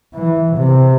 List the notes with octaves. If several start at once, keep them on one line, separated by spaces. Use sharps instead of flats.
E3
C3